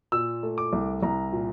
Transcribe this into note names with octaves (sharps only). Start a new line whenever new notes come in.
A#2 E6
A3
D6
C2
C2 A#5
A#2